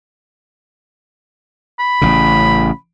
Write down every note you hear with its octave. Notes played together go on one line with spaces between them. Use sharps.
B5
A1 C#3